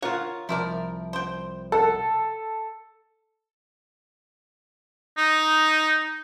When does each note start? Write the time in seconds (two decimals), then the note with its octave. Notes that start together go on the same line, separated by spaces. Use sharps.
0.02 F4 A#4 C#5 F#5
0.49 C2 F3 E4 A#4 D5
1.13 C5 G5
1.72 A4 F#5
5.18 D#4